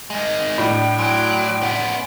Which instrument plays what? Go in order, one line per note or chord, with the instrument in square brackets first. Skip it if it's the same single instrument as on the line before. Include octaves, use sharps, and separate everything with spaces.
[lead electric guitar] D#3 G#3
[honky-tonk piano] A2 D4 [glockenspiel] B5
[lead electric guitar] F#3 [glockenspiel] G#5 C6 D7
[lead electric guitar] B3 C#4